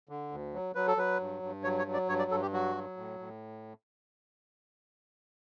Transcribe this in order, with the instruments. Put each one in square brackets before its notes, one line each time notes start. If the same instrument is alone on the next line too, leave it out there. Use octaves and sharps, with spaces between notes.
[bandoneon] D3
D2
F#3
F#3 B4
A4
F#3 B4
G2
G2
F#3 C#5
C#5
F#3
D5
G2 C#5
D5
G2 A4
G4
F#3 F#4
F#3
A2
A2